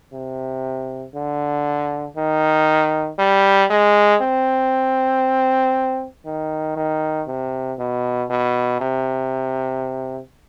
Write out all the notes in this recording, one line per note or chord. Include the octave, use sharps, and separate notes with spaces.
C3
D3
D#3
G3
G#3
C4
D#3
D#3
C3
B2
B2
C3